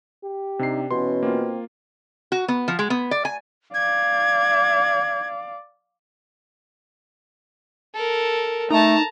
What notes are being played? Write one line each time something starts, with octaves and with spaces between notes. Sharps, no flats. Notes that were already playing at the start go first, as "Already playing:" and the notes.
G4
C3 D4 D#4 C7
B2 E3 B3 C#4 C6
A#3 C4 F4
F#4
B3
F3
G#3
B3
D5
G#5
D5 F5 G#6
A4 A#4
A3 D#4 A5 A#5